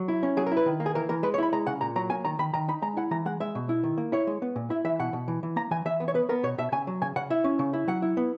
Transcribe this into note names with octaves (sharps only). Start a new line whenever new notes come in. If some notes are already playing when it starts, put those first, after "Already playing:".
Already playing: F#3
E4
C#4
F#3 G#4
A#4
E4
B4
D#3
A#3
G#4
E3 A#4
E3 A#4
G#3 B4
C#5
E4 B5
G#3 A#5
C#3 F#5
A#2 A#5
F#3 A#5
A#3 G#5
D#3 A#5
D#3 B5
D#3 A#5
D#4 B5
G#3 A#5
E4 F#5
E3 A#5
G#3 F#5
G#3 E5
B2
E4
D#3
A#3
E4 C#5
G#3
B3
A#2
E4 E5
E3 E5
B2 F#5
B2
E3
E3
A#3 A#5
E3 G#5
E3 E5
B3
C#5
B3 B4
B3 A#4
B2 C#5
B2 E5
C#3 G#5
F#3
C#3 G#5
C#3 F#5
E4 E5
C#4
C#3
E4
F#3 F#5
E4
B3